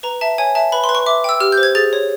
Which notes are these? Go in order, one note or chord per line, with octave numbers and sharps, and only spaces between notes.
B4 A#5
E5 A5
C#5 G#5
E5 A5
B4 B5
C6
B4
C#6
E5 D6
G5 E6
G4 F6
G6
C5
G#6
G#4 A6
C#5